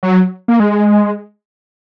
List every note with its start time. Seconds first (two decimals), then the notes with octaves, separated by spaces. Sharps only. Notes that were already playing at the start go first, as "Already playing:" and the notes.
0.03 F#3
0.48 A#3
0.60 G#3